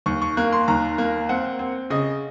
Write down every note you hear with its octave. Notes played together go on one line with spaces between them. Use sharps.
D#2 C#6
C#6
A#3 F#6
C6
D#2 A#5
A#3
C4 F#5
C4
C#3 D#5